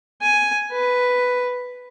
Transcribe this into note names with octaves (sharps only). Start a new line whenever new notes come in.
G#5
B4